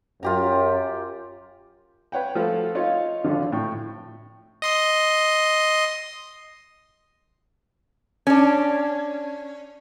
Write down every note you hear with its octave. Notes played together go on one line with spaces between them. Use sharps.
F#2 F4 G4 A#5
B4 C#5 F#5 G5
F3 A3 A4 F5
D#4 F4 C#5 F5
G#1 D3 F3
A2 G5
D#5 C6 D#6
C#4 D4